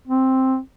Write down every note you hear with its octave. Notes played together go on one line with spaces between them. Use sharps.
C4